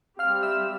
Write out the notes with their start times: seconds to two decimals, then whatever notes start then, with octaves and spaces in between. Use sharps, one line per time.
0.19 G3 C4 G4 F5 F6
0.43 E5 E6